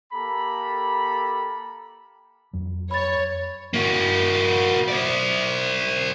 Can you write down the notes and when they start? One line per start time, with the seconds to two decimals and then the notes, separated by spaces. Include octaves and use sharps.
0.13 A#3 G4 A4 A#5 B5
2.53 F2 F#3
2.91 C#5 B5 A6
3.74 A#3 F#4
4.88 C5 D5